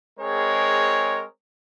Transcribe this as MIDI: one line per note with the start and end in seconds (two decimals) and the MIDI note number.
0.20 1.23 56
0.20 1.23 60
0.20 1.23 68
0.20 1.23 70
0.20 1.23 73